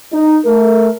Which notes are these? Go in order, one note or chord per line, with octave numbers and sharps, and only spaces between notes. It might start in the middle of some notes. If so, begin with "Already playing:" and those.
D#4
A3 A#4